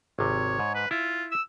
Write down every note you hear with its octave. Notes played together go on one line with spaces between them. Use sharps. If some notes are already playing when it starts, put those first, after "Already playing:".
G#1 C3 C#5
G#2
B4
E4 F4
E6